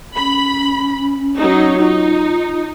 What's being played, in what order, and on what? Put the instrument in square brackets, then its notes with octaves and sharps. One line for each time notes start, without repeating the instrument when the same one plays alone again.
[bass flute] C#4 [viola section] B5
[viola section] F#3 D#4
[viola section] D#4 [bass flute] F4